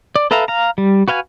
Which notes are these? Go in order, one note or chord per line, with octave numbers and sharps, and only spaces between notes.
D5
A4 B4 E5 F5 A#5
F5 A#5
G3
F#4 B4 F5 G5 G#5